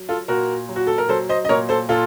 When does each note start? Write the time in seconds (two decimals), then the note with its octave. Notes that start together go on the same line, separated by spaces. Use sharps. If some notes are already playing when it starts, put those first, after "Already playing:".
Already playing: F#3
0.09 F4 A4
0.28 A#2 F#4 A#4
0.69 F#3
0.76 F#4
0.87 A4
0.98 A#4
1.09 F#3 A4 C5
1.29 C5 D#5
1.45 D#5
1.49 A#2 A#4 C#5
1.69 A4 C5
1.89 A#2 F4 A4